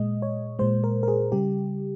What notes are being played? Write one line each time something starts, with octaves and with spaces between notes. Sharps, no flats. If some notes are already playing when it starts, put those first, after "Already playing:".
Already playing: A#2 G#3 D#5
C#5
A#2 G#3 C5
A#4
A#4
G#4
C#3 G3 G4